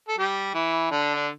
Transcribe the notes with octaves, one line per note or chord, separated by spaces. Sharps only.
A4
G3 G4
E3 E4
D3 D4
D4